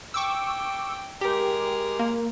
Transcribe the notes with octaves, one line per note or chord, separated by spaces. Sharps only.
G5 C#6 D6 E6
G#3 G4 A#4
A#3